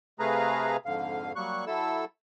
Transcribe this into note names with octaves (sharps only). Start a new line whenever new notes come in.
C3 A3 G#4 B4 F5 A#5
F2 G#2 D3 F5
F#3 G3 A#3 C#6 F#6
F#3 E4 A4 E6